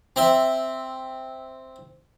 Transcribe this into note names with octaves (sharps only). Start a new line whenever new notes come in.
C4 E5